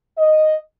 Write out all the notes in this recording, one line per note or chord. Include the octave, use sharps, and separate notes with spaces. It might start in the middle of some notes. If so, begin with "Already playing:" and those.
D#5